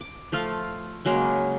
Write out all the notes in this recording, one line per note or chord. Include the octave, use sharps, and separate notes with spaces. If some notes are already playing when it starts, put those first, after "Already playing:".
D6
F3 A3 F4 F5
C#3 F#3 G#3 A#3